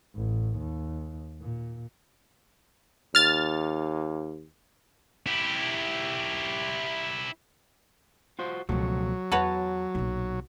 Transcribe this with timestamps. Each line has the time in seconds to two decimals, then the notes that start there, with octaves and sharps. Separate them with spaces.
0.14 A1
0.58 D#2
1.42 A#2
3.15 D#2 F6 A6
5.26 E4 G4
8.39 F4 F#4 C5
8.69 C#2 B2 D3 F3 F#3 A3
9.32 E2 E4 F#4 B4 C#5 A5
9.95 B1 A#2